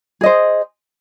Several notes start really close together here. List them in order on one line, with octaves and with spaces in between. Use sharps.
G#4 D#5 C5